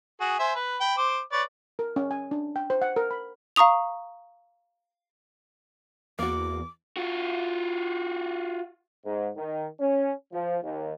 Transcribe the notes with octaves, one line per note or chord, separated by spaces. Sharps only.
F#4 G#4
C5 E5 G#5
B4
G5 B5
C5 D6
B4 C#5 D5
A#4
C#4
G#5
D4
G5
C5
F#5
A#4
B5
F5 A#5 C#6 D#6 F7
E2 A#3 F#4 D6
F4 F#4
G#2
D#3
C#4
F3
D#2